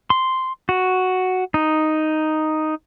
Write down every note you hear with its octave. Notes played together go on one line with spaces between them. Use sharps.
C6
F#4
D#4